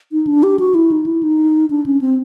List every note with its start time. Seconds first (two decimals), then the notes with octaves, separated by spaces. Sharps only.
0.12 D#4
0.27 D4
0.43 G4
0.59 F#4
0.75 E4
0.92 D#4
1.06 E4
1.23 D#4
1.70 D4
1.86 C#4
2.01 C4